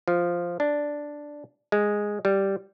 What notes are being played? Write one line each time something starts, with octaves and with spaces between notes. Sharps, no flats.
F3
D4
G#3
G3